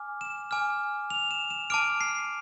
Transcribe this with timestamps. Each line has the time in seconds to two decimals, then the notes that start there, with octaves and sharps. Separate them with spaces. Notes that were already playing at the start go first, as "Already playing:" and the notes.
Already playing: G#5 D6 F6
0.21 E7
0.51 G#5 D6 F6
1.10 F7
1.31 E7
1.50 E7
1.70 A5 D6 F6 D7
2.01 C7